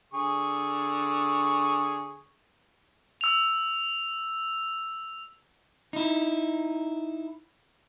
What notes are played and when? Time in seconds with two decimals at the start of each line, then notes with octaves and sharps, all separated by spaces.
0.14 D3 G#4 C#6
3.21 E6 F7
5.93 D#4 E4